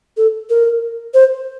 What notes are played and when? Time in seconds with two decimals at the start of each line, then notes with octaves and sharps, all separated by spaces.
0.17 A4
0.50 A#4
1.14 C5